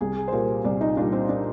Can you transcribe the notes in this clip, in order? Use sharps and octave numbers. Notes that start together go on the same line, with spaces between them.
C2 G#4
G#4
C5
A#2 G3 A#4
C2 D5
D#4
A#2 G3 D4
C4
D4